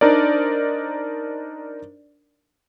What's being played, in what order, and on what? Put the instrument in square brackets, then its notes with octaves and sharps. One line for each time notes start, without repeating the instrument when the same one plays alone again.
[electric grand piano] D4 D#4 A#4 C5 D5